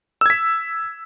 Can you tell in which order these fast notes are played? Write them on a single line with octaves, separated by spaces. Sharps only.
E6 G#6 B6